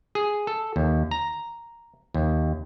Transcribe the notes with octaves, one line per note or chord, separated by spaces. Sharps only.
G#4
A4
D#2
A#5
D#2